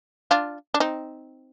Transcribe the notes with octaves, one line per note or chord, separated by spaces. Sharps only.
D4 F4
D4
C4 D#4